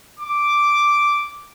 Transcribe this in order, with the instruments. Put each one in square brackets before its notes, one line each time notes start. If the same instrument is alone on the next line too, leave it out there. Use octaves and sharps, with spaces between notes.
[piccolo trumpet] D6